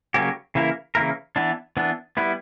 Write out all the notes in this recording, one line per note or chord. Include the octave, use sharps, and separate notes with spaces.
C#3 F#3 A#3 C#4 G4
C#3 E3 A#3 E4 A#4
C#3 E3 A#3 E4 A#4
E3 B3 D4
E3 B3 D4
G3 B3 E4 B4